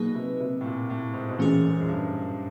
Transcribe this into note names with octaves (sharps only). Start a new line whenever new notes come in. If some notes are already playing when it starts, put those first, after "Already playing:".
Already playing: B2 F#3 A#3 D#4 G#4 B4
C3
C3
A2
A#2
A2
G#2
B2
A#2 E3 A3 C#4 F4 G#4
G#2
F#2
G2